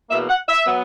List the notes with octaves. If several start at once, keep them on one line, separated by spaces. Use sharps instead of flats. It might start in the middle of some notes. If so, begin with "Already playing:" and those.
E2 B2 A#3 E5
F#5
E5
F#3 B3